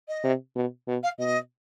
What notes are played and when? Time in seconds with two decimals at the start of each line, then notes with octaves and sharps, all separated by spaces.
0.08 D#5
0.24 C3
0.56 B2
0.88 B2
1.03 F5
1.19 B2 D#5